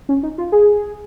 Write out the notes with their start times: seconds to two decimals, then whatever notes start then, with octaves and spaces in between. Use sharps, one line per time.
0.09 C#4
0.23 D#4
0.38 F4
0.52 G#4